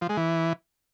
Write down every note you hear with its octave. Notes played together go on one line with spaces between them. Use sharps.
F3
G#3
E3